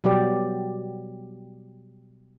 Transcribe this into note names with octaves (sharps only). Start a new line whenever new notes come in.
B2 F#3 G3 G4 D5